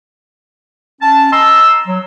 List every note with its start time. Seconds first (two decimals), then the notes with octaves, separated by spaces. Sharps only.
1.01 C#4 A5
1.32 D#5 A5 A#5 C6 E6
1.87 F#3